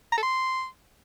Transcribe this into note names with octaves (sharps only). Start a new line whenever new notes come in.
A#5
A4
C6